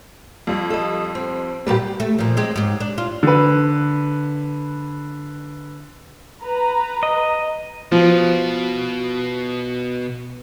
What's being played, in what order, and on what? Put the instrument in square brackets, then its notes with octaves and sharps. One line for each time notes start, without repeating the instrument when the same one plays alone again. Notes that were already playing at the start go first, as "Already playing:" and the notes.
[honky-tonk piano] F2 G3
[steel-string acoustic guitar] A4 D#5
C4
[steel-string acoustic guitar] A#2 A#3 B4 [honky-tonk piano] G3 G4
[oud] A3
A#2 F3
G#3 C4 G4
G#2 G4
D4
F4
[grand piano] D3 B4
[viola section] B4 A#5
[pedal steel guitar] D#5
[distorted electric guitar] B2 [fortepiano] F3